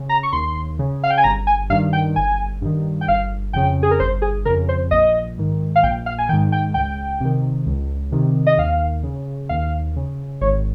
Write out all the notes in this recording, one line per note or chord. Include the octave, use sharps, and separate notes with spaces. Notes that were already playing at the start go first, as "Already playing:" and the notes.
Already playing: C#3
A#5
C#6
D#2 C6
C#3
F5
G5
G#5
G1 A#5
G#5
G2 D#3 F5
G5
G1 G#5
G2 D#3
G5
G1 F5
F2 C#3 G5
G#4
A#4
G1 C5
G#4
F2 C#3 A#4
C5
A#1 D#5
G#2 D#3
F5
A#1 G5
F5
G#5
G#2 D#3 G5
G5
C#2 G5
C3 D#3
C#2
C3 D#3
D#5
D#2 F5
C#3
D#2 F5
C#3
G#1 C#5